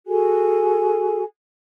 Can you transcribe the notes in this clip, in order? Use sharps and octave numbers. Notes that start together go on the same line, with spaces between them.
F#4 G#4 A4 G#5